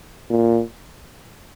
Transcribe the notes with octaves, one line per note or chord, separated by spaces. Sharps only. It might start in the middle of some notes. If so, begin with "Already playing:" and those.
A#2